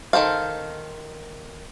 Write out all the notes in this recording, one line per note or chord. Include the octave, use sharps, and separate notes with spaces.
D#3 A4 C5 F5